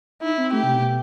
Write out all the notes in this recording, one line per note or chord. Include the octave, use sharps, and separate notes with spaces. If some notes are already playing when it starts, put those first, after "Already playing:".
D#4 E4
C4
A3 G4
C3
B2